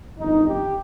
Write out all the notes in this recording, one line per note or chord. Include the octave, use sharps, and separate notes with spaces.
G1 F2 D#3 D#4
G4